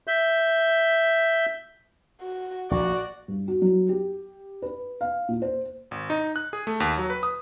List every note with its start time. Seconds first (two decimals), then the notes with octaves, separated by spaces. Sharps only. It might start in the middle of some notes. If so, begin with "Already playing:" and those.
0.07 E5 G6
2.21 F#4
2.71 A#1 F#4 D5
3.28 G2
3.48 F#4
3.62 F#3
3.89 G4
4.62 B4
5.01 F5
5.28 A#2
5.42 C5
5.91 G#1
6.10 D#4
6.36 F#6
6.53 G#4
6.67 A3
6.80 D#2
6.98 F#3
7.10 B4
7.23 D#6